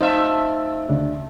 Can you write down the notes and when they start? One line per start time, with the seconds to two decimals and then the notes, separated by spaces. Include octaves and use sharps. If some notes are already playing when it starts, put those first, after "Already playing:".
0.01 F2 A3 D#4 C5 E5 F5
0.89 D2 C#3 D4